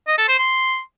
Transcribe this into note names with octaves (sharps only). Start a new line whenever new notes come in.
D#5
A4
C5
C6